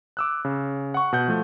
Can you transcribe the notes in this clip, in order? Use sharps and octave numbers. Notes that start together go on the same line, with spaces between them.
D6 E6 F#6
C#3
F#5 C#6
B2 F#5 G6
F3 A3